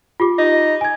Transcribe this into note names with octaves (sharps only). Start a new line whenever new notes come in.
F4 G4 D6
D#4
G#5 G#6